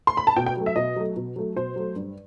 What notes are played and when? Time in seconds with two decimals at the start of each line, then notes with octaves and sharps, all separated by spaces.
0.07 C6
0.17 B5
0.27 A5
0.37 B2 G5
0.47 G5
0.57 F#3 A3
0.66 E5
0.76 B2 D#5
0.96 F#3 A3
1.16 B2
1.36 F#3 A3
1.56 B2 C5
1.76 F#3 A3
1.96 G2